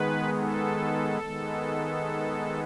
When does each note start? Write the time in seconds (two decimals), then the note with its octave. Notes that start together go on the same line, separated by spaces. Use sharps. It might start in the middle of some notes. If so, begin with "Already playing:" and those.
Already playing: D#3 G#3 B3 B4
0.38 A4
1.21 D#3 G#3 B3